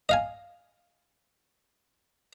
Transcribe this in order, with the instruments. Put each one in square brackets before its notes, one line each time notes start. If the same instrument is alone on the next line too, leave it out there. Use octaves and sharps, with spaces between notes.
[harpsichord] D#5 F5 G#5